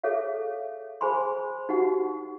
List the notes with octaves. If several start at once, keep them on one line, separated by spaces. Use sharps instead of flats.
G#4 A4 C#5 E5 F5
G#4 C5 G#5 B5 C6
D#4 F#4 G4 F#5